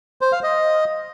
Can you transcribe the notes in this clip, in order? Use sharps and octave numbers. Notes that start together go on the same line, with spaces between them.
C5
F5
D#5